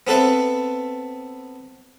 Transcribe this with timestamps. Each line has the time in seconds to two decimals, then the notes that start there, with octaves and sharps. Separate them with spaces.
0.07 B3 C4 A4 B4 E5